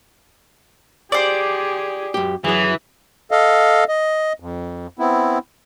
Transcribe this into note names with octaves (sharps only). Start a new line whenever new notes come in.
G4 G#4 C5 D5
F#2 G4
F#2 E3 F#3 G#4
A4 D#5 F5
D#5
F2
B3 C4 E4